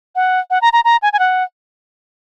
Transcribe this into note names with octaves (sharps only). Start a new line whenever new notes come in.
F#5
F#5
A#5
A#5
A#5
G#5
G#5
F#5